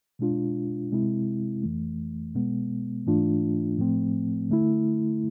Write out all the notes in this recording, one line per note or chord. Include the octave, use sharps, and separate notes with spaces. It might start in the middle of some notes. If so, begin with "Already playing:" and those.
B2 G#3 D4 F4
C3 G#3 C4 E4
F2 E3 A3
B2 G#3 B3
G#2 E3 A3 D4 F4
A2 F3 A3 C4
D3 A3 E4